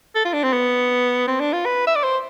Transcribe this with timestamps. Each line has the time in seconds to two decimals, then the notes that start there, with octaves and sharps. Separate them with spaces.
0.15 A4
0.25 F4
0.33 D4
0.44 C4
0.53 B3
1.28 C4
1.40 D4
1.53 F4
1.65 B4
1.87 E5
1.96 D5
2.03 C5